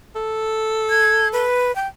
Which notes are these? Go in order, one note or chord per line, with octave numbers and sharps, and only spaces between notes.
A4
G#6
B4
G5